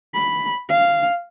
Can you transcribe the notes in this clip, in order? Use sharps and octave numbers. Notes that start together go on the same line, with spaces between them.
B5
F5